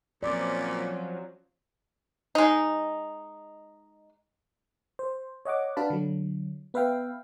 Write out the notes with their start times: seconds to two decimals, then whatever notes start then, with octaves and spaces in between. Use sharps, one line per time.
0.23 A#2 F3 F#3 C4 C#4 D5
2.35 G#3 D#4
4.99 C5
5.45 C#5 D#5 F#5 D6
5.77 D4 F#4 B4 F5 A5 B5
5.90 D3 F#3
6.74 B3 B4 E5 F5 G5